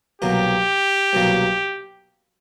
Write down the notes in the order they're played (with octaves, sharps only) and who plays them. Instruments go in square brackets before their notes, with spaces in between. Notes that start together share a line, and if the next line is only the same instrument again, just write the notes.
[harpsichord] C2 B2 F#3 A#3 [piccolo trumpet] G4
[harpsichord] C2 B2 F#3 A#3